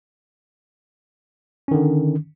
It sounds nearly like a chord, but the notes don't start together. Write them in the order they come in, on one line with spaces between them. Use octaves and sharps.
C#4 D#3 D3